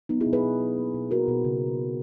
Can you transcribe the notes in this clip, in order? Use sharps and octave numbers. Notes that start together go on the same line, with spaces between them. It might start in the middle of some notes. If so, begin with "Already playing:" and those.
F#3 B3 D#4
E4 G#4
B2
G#4 B4
B2
F#3
A#3
B2
A#3 F#4 A#4
B2
C#3